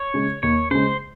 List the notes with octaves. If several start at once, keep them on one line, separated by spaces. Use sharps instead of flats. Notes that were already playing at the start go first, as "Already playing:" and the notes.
Already playing: C#5
C#3 G#3
D#2 C#5
C#3 G#3 C5